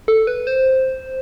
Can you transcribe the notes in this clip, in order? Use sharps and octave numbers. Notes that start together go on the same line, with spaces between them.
A4
B4
C5